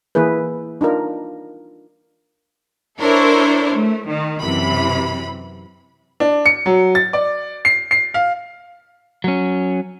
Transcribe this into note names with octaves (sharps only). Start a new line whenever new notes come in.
E3 A#3 E4 G#4 B4
D4 D#4 F4 A#4
D4 E4 A4 A#4 C5 C#5
A3
D#3
F#2 C3 E3 B5
D4
C#7
F#3
A6
D5
C7
C7
F5
F#3 C#4